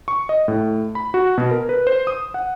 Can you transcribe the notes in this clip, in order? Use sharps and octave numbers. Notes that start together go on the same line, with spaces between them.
C#6
D#5
A2
B5
F#4
B2
A#4
B4
C5
D#6
F#5